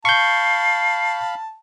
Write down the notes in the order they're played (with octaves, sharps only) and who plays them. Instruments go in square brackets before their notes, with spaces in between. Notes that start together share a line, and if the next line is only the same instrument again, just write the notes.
[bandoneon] F5 B5 [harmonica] A5 [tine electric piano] C#6 G6 [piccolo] C7